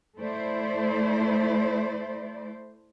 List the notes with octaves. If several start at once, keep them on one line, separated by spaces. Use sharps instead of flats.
A3 E4 C5 D5